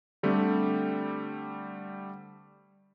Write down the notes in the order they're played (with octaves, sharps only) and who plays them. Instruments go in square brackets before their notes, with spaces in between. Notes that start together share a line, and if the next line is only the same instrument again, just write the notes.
[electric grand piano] D3 G3 A3 C4